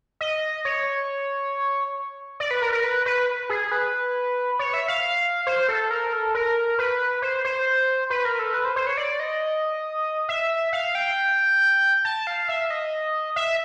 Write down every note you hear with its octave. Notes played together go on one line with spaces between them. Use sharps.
D#5
C#5
D5
B4
A#4
A#4
B4
B4
G#4
B4
C#5
E5
F5
C5
A4
A#4
A4
A#4
B4
C5
C5
B4
A#4
A4
B4
C5
C5
C#5
D5
D#5
E5
F5
G5
A5
F5
E5
D#5
E5